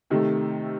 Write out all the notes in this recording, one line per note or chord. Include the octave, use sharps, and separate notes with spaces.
C3 D#3 A3